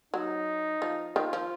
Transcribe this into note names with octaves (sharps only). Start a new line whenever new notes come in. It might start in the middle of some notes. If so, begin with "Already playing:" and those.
F#3 D#4
F3
D#3 F4
F3